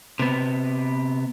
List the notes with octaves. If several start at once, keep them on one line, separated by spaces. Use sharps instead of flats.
C3 B3